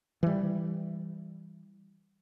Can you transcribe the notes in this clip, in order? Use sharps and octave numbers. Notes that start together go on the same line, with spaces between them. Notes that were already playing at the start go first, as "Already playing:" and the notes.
E3 G3